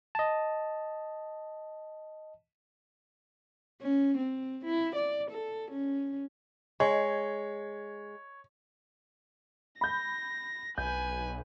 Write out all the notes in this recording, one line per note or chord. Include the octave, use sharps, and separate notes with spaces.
D#5 A5
C#4
C4
E4
D5
A4
C#4
G#3 C#5
B5 G6 A#6
B1 B4 G#5 G6